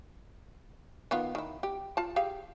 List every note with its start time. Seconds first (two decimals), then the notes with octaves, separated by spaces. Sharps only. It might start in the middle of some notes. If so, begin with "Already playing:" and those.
1.11 D#3 B3 F4
1.35 D#3 E4
1.63 G4
1.97 F4 A5
2.16 G4 G#4 F5